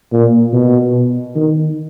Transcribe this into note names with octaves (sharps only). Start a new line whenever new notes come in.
A#2
B2
D#3